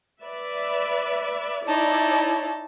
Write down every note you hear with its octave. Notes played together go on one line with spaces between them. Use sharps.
B4 D5 E5
D#4 E4 C#5 D5 A5